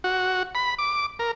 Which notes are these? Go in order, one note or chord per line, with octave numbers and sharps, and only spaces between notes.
F#4
B5
D6
A#4